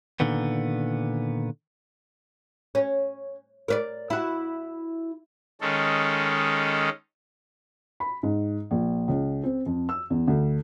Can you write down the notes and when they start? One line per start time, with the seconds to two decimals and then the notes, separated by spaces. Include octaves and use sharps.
0.20 A#2 D3 D#3 B3
2.75 C#4
3.68 A#4 B4 D5
4.10 E4 F#4
5.61 D#3 G#3 C#4 A4
8.00 B5
8.23 G#2
8.71 A#1
9.08 C#2
9.43 C4
9.66 F2
9.89 E6
10.10 E2
10.27 D2